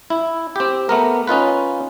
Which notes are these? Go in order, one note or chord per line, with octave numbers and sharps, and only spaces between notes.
E4
C4 G4
A3 B3 A#4
C#4 D#4 F4 B4